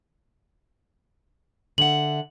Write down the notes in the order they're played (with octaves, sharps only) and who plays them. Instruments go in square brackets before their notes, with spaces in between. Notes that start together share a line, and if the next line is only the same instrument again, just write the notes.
[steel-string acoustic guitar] D3 E5 F#5 [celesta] F#7